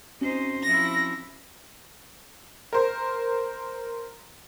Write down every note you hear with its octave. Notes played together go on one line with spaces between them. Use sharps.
C4 C#4 D#4 F#4 C5
F3 E4 A#6
A#4 C5